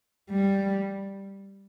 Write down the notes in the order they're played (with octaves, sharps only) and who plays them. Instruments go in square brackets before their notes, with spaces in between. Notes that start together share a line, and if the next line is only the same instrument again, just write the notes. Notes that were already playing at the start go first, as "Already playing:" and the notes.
[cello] G3